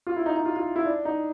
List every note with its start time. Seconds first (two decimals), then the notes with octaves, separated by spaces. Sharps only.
0.07 F4
0.16 E4
0.26 D#4
0.36 D#4
0.45 F4
0.56 F4
0.76 E4
0.85 D4
1.05 D#4